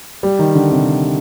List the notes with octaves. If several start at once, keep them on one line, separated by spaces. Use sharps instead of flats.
G3
D#3
D3
C3